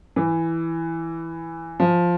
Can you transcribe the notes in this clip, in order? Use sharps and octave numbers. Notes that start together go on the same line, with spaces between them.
E3
F3